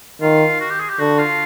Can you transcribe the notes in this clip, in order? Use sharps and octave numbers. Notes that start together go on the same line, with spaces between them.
D#3 F4
F#4
G4
G#4
G4
D3 F#4
F4